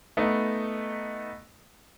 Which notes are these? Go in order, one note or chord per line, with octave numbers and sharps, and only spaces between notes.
A3 B3 D#4